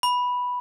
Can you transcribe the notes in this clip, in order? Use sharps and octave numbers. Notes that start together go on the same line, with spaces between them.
B5